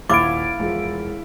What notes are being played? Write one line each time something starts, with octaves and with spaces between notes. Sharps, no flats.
D#1 E4 F5 D6 A6 D7
E1 F3